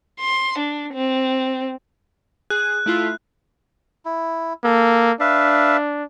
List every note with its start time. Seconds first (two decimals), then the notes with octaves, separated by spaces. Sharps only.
0.20 C6
0.58 D4
0.94 C4
2.50 G#4 F#6
2.86 A3 E4 F4
4.05 E4
4.64 A#3 A4
5.20 D4 B4 E5 F5